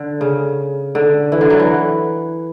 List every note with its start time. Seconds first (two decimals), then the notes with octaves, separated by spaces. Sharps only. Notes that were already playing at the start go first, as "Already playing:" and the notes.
Already playing: D3
0.21 C#3
0.95 D3
1.32 E3
1.41 D3
1.50 F#3
1.60 E3